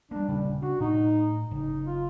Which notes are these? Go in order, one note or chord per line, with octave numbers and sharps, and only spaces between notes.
G3 A#3 D4
D#1 C#3 G3
D4 F#4
A2 D#4
F#1 D#4
F4